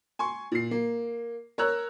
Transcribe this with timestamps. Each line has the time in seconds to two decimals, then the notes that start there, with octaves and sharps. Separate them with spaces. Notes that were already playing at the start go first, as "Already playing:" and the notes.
0.19 G#5 C6 C#6
0.52 A#2 C7
0.71 A#3
1.58 A#4 C#5 A#5 E6 F#6